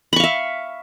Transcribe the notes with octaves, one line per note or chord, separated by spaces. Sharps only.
E5 F5 B5 C#6